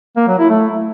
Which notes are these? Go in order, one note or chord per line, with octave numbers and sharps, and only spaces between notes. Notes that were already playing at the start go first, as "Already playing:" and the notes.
A#3
F#3
E4
A3